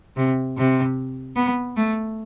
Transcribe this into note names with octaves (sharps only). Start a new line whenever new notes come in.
C3
C3
B3
A3